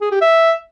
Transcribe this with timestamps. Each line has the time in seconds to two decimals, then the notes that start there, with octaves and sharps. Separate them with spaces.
0.01 G#4
0.11 G4
0.21 E5